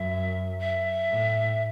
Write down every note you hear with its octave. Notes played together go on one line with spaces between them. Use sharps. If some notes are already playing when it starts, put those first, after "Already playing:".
Already playing: F#2 E5
E5
A2